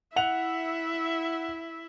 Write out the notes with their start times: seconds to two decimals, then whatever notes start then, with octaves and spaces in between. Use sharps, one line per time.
0.16 E4 E5 F#5 F7